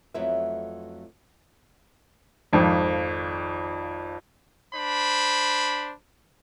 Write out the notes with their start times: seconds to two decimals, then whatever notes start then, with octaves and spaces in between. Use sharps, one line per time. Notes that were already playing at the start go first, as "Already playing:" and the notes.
0.14 F2 F#3 A3 B3 E4 E5
2.53 G#1 F2 D#3 F3
4.74 D4 C5 B5